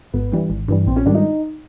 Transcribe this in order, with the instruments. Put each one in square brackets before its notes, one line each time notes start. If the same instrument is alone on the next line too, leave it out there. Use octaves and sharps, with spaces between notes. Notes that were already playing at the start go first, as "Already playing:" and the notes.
[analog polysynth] G#1 [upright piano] B3
[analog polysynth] G2 E3 G3
G#1
G2 E3 G3
[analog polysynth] A#1 [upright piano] C4
[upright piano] C#4
[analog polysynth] G#2 D#3 G3 [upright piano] D4
[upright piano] D#4